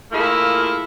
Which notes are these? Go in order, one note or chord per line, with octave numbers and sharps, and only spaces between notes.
A3 A#3 E4 F4 G#4